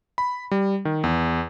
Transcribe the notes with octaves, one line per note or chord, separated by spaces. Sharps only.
B5
G3
D#3
E2